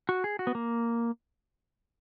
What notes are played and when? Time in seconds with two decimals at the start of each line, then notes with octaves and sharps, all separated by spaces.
0.09 F#4
0.24 G#4
0.39 F#4
0.47 B3
0.55 A#3